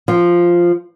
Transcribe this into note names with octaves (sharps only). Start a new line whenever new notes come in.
F3